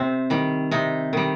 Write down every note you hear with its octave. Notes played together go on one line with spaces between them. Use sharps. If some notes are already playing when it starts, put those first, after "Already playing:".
Already playing: C3 C4
D#3 G3
C3 D#4
D#3 G3